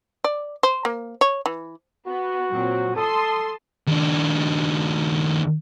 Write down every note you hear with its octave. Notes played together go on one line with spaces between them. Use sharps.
D5
C5
A#3
C#5
E3
B3 F#4
A#2 F#3 C4
A4 A5 C6 D#6
D#2 D4